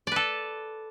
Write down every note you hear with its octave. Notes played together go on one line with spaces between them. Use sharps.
A4 B4 D5